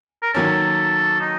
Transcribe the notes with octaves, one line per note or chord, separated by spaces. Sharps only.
A#4
D#3 F#3 A#3 C#4 A4
D#4